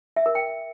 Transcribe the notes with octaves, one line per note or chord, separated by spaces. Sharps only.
E5
A#4
G5